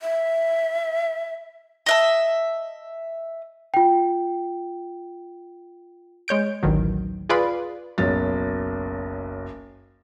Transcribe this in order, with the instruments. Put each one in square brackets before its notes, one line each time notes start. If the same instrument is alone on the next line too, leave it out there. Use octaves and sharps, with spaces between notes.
[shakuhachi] E5
[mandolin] D#5 E5 A5
[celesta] F4 G5
[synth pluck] G#3 C#5 G6 D7
A1 D2 D#3 F#3
F4 G#4 B4 D5 F5 B5
[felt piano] F#1 B1 A6